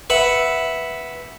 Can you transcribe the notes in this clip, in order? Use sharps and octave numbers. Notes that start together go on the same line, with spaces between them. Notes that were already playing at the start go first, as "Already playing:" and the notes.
B4 E5 F#5